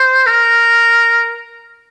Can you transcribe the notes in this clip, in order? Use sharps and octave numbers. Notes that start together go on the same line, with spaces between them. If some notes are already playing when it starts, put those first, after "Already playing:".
Already playing: C5
A#4